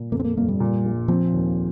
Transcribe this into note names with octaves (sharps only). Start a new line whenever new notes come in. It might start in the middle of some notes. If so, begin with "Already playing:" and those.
Already playing: A#2
F2 A#3
C4
A#3
G1 A#3
G3
A#2
A#1
F3 C4
D#2